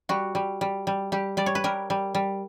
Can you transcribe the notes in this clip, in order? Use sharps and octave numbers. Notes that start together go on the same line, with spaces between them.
G3 F#4
G3
G3
G3
G3 G4
G3 D5
C#5
B4
G3 A#4
G3
G3